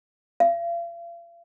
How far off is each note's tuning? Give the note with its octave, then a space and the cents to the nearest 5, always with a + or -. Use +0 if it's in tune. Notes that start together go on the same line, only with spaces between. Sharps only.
F5 -45